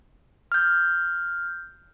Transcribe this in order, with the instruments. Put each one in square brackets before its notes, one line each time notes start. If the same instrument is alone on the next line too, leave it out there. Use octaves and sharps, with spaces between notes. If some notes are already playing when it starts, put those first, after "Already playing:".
[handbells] F6 G6